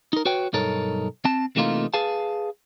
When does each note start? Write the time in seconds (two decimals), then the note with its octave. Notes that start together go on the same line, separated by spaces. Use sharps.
0.13 D#4 A#4
0.25 F#4 B4 C#5 G5
0.53 B1 G2 D#4 A4 A#4 C#5
1.25 C4 A5
1.56 C3 E3 A3 A#3 D#4 F4
1.94 G#4 B4 F5 A5